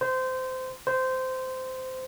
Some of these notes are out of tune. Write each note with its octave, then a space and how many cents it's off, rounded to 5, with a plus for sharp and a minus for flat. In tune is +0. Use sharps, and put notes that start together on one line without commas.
C5 -20
C5 -15